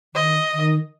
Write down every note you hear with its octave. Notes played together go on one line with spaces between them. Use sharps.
D#3 D#5
D#3